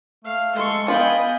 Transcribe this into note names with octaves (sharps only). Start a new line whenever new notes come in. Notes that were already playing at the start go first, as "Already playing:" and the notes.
A3 F5
G#3 A4 C6 C#6
B3 F4 D#5 G5 G#5 B5